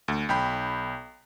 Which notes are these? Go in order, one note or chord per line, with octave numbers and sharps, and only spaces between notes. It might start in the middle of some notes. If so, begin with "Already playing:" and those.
D2
B1 G5 B5